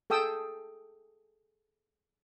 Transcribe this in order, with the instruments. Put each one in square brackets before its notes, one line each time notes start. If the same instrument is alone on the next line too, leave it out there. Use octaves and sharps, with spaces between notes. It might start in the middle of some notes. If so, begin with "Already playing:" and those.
[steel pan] G#4 A4 G5 D#6 E6